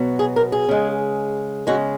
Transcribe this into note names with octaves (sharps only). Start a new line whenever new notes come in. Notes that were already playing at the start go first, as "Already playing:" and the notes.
Already playing: B2 F#3
G#4
A#4
G#4
C#3 G#3
C#3 G#3 F#4